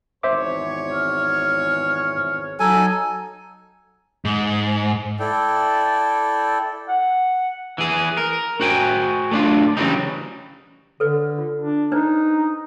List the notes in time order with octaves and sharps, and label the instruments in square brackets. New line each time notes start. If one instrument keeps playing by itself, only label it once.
[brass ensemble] G#1 E2 C#5 [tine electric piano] C5 E5 D6
[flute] F6
[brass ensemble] F#3 D#4 [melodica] A4 G#5 [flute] A#5
[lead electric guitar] G#2
[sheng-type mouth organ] E4 A4 D5 G5
[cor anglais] F#5
[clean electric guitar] E3 G#4
A#4
F#4 C5 G5 G#5
A3 D4 F4
C#3 E3 F#3 G3 C4 D#4
[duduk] D3 [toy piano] A4 B4
[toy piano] F4
[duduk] D4
[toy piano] D4 B4 C5 [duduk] D#4